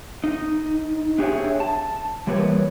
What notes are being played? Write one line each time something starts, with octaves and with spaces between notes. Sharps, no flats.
D#4
D4 G4 G#4 A#4 C#5 E5
A5
E3 G3 A#3 B4 C#5